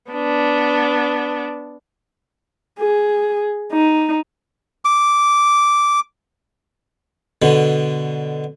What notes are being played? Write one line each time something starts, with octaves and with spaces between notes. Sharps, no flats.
B3 D4
G#4
D#4
D6
B2 D3